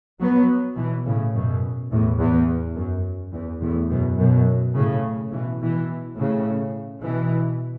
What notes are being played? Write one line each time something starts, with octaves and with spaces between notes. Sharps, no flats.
F#3 B3
B2 E3
A2 C#3
F#2 B2
E2 A2
E2
F#2
E2
E2 A2
F#2 B2
F#2 B2
A2 C#3
B2 E3
B2 E3
A2 C#3
B2 E3